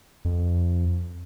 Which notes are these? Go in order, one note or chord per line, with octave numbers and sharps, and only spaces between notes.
F2